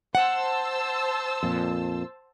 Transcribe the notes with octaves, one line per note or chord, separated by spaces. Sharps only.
C5 F#5 A5 E6
F2 A#2